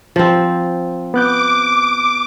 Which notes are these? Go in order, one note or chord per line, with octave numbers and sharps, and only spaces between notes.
F3 C4
B3 D6 F#6 G6